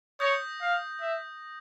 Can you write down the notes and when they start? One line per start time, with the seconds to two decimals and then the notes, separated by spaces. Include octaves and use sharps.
0.20 C#5 D#6 G6 A#6
0.61 F5
1.01 E5